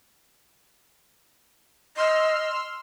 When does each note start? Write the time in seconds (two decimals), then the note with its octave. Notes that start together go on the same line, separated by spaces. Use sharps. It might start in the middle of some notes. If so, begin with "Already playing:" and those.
1.97 D#5 C6 E6 F6